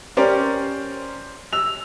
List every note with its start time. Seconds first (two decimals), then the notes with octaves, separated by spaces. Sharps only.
0.17 C#4 G4 A#4 C5 D5
1.53 E6 F7